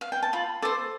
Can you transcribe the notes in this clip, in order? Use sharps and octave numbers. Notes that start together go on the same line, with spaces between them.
F5
G5
A5
F4 B5
A4 C5 D6